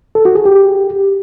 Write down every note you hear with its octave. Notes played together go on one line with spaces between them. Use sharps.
A4
F#4
G#4
G4